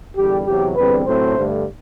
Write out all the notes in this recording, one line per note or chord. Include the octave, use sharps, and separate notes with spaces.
E2 D3 G3 G4
E2 C3 F#3 G4
E2 D3 G3 C4 B4
A2 F#3 A3 C4 C5
G2 D3 A3